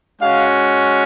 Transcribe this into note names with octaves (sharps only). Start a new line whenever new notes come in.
G#3 C#4 F#4 F5